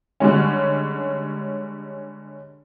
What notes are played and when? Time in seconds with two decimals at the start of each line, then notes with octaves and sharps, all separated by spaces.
0.20 D3 G3 G#3 C#4